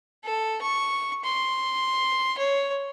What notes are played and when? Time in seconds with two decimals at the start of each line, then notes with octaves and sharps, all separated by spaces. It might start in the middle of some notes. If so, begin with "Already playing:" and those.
0.24 A4
0.62 C#6
1.24 C6
2.38 C#5